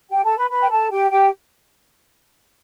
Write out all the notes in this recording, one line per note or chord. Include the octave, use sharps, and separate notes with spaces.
G4 G5
A4 A5
B4 B5
B4 B5
G5
A4 A5
G4 G5
G4 G5